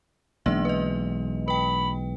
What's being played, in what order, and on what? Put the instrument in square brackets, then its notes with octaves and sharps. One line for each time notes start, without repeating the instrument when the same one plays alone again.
[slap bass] B1 E3 G#3 [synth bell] A#3 D4 E5
[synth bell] B4 D#5
[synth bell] B4 G5 [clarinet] B5